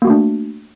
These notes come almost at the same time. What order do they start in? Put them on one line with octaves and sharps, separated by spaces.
A#3 F#4 A3 D4